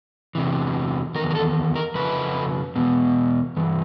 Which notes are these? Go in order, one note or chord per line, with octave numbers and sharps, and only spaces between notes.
E2 C3 E3
E2 C3 D#3 A#4
A#4
A4
A#4
F2 C#3 B4
E2 B2
G2 E3